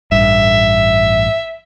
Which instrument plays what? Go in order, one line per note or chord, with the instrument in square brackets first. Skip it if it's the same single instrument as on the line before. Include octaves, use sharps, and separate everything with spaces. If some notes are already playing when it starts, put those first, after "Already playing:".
[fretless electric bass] A1 G2 [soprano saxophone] E5